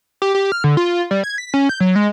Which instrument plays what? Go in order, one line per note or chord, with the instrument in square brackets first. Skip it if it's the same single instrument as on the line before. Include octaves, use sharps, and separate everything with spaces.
[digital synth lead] G4
G4
F6
D3
F4
G3
G#6
B6
C#4
G6
F#3
G#3